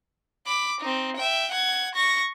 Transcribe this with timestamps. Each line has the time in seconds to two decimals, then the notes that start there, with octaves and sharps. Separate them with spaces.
0.47 B5 D6
0.81 C4 D#4
1.17 E5 G5
1.51 F#5 G#6
1.95 C#6 A#6